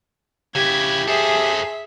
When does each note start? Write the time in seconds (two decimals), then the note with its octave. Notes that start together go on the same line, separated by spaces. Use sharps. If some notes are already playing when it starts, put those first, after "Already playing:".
0.55 C#3 E4 G4 G#6
1.08 G#4 A4 C5 E5